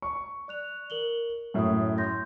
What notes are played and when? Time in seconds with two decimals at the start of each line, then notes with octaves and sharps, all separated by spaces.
0.02 C#6
0.48 D5 F#6 F7
0.90 A#4 F#7 G7
1.54 F#2 A2 E5 D#6
1.98 C6 G6 A#6